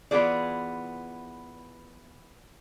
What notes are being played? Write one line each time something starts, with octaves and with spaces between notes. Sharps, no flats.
E3 B3 F4 G#4 D5